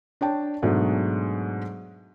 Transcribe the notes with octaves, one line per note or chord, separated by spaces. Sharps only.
D4 C#5 G5 A5
G#2 B2 F#3 G#3 A3 D4